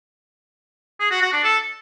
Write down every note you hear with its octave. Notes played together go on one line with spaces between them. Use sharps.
G#4
F#4
F#4
D4
A4